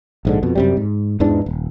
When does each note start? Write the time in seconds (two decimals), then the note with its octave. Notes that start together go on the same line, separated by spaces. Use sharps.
0.25 A#1 G#2 D3
0.43 F2 B2
0.55 F#2 C3 G3
0.77 G#2
1.20 E2 G#2 E3 D4
1.46 D#1